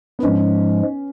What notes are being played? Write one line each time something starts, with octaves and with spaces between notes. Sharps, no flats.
B3
G#2 F3 G#3 C#4